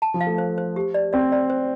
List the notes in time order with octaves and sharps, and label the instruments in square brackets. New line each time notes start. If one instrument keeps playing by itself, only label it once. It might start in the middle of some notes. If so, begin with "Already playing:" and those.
[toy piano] A5
[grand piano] F3
[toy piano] F5
[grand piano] A3
[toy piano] C5
C5
G4
D5
[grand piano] C4 [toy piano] D5
[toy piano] D5
C5